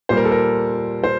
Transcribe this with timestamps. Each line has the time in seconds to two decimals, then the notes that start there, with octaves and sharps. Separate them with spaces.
0.09 A#2 G3 A#3 C5
0.17 A#4
0.25 A4
0.32 A#4
1.04 C5